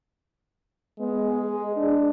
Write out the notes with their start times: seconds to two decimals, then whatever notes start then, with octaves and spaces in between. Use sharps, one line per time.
1.00 G#3 B3
1.41 G#4
1.77 D4